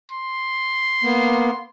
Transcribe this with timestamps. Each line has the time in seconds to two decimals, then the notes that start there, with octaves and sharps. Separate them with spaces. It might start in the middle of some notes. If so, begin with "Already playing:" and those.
0.12 C6
1.04 A#3 B3